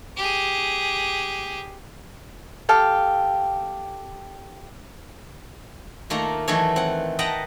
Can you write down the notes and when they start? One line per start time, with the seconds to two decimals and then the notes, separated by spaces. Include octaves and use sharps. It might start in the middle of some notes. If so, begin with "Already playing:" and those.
0.17 G4 G#4
2.69 G4 A4 F5 G5
6.10 D#3 A3 A#3 F4 A#5
6.48 D#3 E3 F#3 A3 A4 C#5
6.76 C4 F#5
7.19 B4 D#5 F#5 G5 A5 A#5